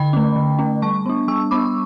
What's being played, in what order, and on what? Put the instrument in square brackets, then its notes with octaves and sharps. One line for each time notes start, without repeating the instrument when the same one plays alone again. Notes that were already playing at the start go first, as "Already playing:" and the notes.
Already playing: [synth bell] D3 G5 B5
A3 C#4
D3
A3 C#4
G3 A5 C#6
B3 D4
G3 C#6 E6
B3 D4 B5 D6